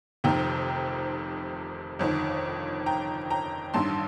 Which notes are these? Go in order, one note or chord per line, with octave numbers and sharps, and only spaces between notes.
F1 F2 C3 D#3 G5 A#5
G1 F2 D#3
G5 A#5
G5 A#5
A1 G2 D#3 A5 C6